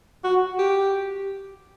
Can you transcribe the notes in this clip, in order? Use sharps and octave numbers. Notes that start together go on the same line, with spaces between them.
F#4
G4